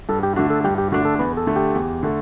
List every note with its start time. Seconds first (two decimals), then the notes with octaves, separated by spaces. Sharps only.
0.09 G2 A4
0.23 G4
0.36 D3 A3 D4 F#4
0.50 A4
0.64 G2 G4
0.78 G4
0.92 D3 A3 D4 F#4
1.05 A4
1.19 E2 B4
1.37 A4
1.47 D3 A3
1.56 G4
1.74 E2
2.03 D3 A3